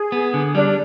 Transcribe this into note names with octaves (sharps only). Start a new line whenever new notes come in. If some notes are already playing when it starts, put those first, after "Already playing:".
Already playing: G#4
B3
D3
G3 D4
D4